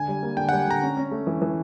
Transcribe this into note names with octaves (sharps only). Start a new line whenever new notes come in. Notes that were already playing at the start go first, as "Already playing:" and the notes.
Already playing: D3 G#5
G3
A#3
D3 G5
F#5
G3
D3 A#5
C#4
C#4
A3
E3
E3